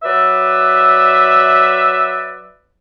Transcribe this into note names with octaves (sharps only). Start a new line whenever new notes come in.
F#3 B4 D5 E5